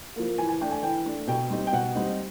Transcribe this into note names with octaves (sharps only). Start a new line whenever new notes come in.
F3 A#3
E3 G#5
G#5
A3 D4 G5
G#5
E3 G5
A3 D4
B2 G5
G3 C4 D#4
G5
B2 F#5
G3 C4 D#4